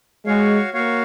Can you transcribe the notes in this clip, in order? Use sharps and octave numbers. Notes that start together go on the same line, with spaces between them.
G#3 F#4 C#5 F5
A#3 F#4 C#5 F5